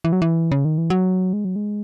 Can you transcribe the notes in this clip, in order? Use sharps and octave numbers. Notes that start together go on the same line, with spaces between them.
E3
F#3
E3
C#3
D#3
E3
F#3
G#3
F#3
G#3